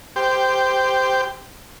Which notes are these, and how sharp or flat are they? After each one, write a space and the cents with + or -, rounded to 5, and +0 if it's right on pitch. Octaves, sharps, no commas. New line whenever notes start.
G4 +0 C5 -15